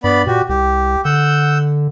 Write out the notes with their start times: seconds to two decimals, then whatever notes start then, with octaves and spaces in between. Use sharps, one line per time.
0.04 G2 B3 D5 B5
0.27 A#2 F#4 G4
0.49 C2 G4
1.05 D3 F#5 E6 G6